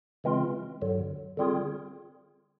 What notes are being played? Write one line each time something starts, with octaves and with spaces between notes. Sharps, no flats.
C#3 E3 G#3 C4 F4
G2 D3 F#3
D3 G3 C4 F4 G#4